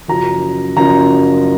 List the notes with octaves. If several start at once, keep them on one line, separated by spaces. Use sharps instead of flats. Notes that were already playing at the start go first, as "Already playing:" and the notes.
F#1 F#2 F3 A#5
F#1 F#2 F3 A#5